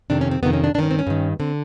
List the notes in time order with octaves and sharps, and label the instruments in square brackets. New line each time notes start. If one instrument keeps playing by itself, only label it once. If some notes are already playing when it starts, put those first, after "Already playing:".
[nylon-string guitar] F2 C3 D#3 D4
C#4
C4
F2 C3 D#3 B3
C#4
D4
G2 D4
D#3 C#4
C4
C#4
G2 D#3
D3 C4